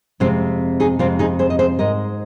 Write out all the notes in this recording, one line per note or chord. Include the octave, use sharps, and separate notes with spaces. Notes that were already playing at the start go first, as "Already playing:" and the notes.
F2 C3 G#3 C4 F4
D#4 G#4
F2 C3 G#3 C4 F4
D#4 G#4
G#4 C5
D#5
G#4 C5
G#2 G#3 A#4 D#5